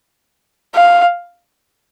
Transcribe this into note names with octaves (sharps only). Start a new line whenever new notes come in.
F5